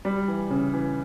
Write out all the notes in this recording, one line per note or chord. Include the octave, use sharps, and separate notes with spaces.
G3
E3
C#3
E3